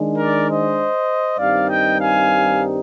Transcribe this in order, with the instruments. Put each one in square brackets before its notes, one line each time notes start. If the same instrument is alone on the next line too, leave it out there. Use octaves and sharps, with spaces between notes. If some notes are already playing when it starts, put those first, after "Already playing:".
Already playing: [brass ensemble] D#3 G#3 D4
A#4 D5
C5 D#5
G2 D#3 G3 C4 D#4 D5 F5
D#5 G5
F5 G#5